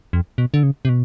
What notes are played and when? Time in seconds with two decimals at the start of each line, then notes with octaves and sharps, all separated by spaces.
0.13 F2
0.38 B2
0.54 D3
0.63 C#3
0.85 C3
0.89 B2